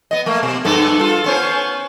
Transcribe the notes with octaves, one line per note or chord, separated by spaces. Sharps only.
B3 D#5
A3 A#3
B2
G2 B3 A4
F4 A4
B3 C#4 C5